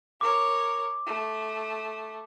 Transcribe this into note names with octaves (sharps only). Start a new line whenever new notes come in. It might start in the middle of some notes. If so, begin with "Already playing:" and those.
A#4 C#5 D6
A3